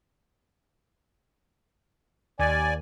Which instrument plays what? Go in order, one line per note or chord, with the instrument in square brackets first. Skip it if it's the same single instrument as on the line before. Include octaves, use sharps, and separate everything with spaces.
[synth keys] D#2 [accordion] D5 G#5